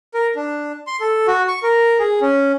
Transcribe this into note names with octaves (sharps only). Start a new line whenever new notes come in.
A#4
D4
C6
A4
F#4
C#6
A#4
G#4
C#4